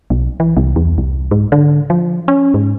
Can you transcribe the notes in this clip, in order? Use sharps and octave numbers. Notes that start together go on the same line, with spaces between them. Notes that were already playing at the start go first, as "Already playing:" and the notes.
B1
E3
C2
E2
C2
G#2
D3
F3
C#4
G#2